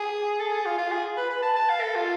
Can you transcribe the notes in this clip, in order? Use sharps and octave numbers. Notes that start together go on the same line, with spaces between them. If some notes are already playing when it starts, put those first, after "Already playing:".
Already playing: G#4
A4
G#4
F4
F4
G#4
B4
B4
A5
A5
F5
A4
F4